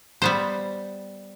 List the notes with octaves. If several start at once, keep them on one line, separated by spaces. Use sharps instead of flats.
G3 B3 C5